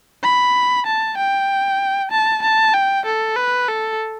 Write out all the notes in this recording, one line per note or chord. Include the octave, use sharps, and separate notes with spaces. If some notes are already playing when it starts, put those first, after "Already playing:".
B5
A5
G5
A5
A5
G5
A4
B4
A4